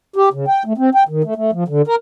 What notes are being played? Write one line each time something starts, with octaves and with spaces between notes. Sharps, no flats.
G4
C#3
G5
A3
C4
G5
D#3
A3
A3
F3
D3
A#4